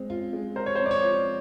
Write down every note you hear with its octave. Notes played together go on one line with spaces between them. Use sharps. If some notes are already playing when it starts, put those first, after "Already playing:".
Already playing: G#3 C4
F4
G#3
A#4 C5
C#5
C4 C5
D5
C#5
F4